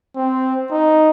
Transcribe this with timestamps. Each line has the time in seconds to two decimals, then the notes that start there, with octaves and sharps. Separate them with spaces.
0.16 C4
0.71 D#4